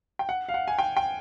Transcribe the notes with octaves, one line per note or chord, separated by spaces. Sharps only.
G5
F#5
F5
F#5
G#5
G5
G5